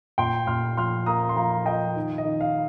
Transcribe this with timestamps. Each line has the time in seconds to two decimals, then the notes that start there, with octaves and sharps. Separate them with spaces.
0.18 A#2 G5 C6
0.47 A#2 C6 F6
0.77 F3 C6 F6
1.06 A#3 A#5 D#6
1.29 C6
1.36 F3 F5 A#5
1.66 F3 D#5 G5
1.96 D#3
2.18 D#5
2.25 D#3
2.41 F5